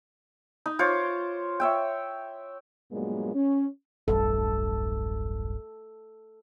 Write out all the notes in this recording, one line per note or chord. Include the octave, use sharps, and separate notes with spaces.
D#4
F4 C5 C#5 D6
C#5 E5 G5
G2 A#2 F#3 G#3 A#3 B3
C#4
E1 B1 G2 A4